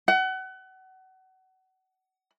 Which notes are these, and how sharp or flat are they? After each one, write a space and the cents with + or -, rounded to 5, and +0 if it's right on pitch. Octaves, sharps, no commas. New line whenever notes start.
F#5 +30